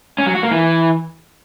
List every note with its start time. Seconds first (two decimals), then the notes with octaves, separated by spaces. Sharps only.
0.18 C#4
0.27 F#3
0.35 F#4
0.43 A#3
0.51 E3